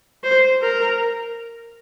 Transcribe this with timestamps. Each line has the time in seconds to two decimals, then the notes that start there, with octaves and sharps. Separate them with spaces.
0.24 C5
0.62 A#4